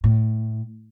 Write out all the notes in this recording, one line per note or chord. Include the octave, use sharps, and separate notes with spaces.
A2